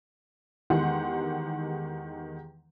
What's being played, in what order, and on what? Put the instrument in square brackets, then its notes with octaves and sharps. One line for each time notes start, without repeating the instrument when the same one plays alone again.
[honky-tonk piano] E2 D#3 G#3 G4 F#5 C6